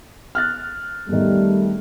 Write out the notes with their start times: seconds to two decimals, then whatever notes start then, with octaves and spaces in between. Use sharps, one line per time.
0.35 F6 F#6 A6
1.08 E2 D#3 G3 A3